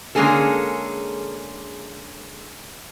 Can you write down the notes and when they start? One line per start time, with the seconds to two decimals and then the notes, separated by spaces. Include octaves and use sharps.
0.15 D3 G#3 A#3 C#4 G#4 A4